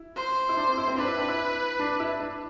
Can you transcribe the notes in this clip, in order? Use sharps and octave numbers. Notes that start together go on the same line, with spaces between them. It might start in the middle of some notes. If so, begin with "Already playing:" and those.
Already playing: E4
C5
E4
D4
C4
E4
C4
D4 B4
E4
D4
E4
D4
E4
D4